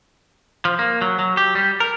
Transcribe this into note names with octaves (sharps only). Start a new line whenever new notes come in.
F3
A#3
F#3
F#3
G4
G3
A#4